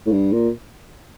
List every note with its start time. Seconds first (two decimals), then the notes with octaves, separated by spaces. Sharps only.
0.06 A2
0.12 G2
0.33 A#2